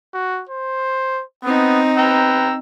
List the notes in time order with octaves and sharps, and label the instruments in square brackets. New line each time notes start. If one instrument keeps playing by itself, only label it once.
[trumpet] F#4
C5
[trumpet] B3 [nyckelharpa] C4 D#4
[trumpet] B4 [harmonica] G5 A#5 E6